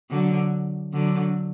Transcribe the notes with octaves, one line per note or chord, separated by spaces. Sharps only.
D3 F#3
D3 F#3